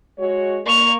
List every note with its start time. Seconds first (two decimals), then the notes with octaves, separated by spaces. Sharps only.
0.18 G#3 F#4 C#5
0.66 A#3 C#6 F7